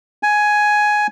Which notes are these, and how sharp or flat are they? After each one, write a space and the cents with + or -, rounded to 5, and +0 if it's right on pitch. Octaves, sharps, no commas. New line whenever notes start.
G#5 +10